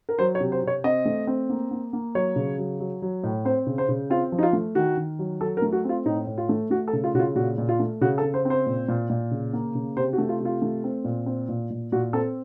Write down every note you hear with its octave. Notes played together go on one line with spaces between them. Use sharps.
A#4
F#3 C5
C#5
C3
C5
C3 C#5
C4 D#5
A3
C4
A#3
A#3
A#3
F#3 C#5
C#3
F#3
F#3
F#3
A2
C4 C5
C#3
C5
C#3
C4 F4
F3
D#4
F4
A3
D#3 F#4
D#3
F#3
F#3 A4
A#4
A3
F#4
C4 F4
A2 D#4
A2
F4
A3
A3 F#4
A4
C#3
F4
C#3 F4 F#4
A#2 F#4
A#2
F4
A3
C#3 F#4
A4
C#3
C5
C4
C5
A#2
A#2
A#2
C#3
A#3
C#3
C3 C5
F#4
A3
F4
C3 F4
A3
C4
A#2
C4
A#2
A#2
A#2 F#4
C4 A4